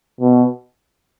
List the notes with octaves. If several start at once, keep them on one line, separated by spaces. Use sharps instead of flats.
B2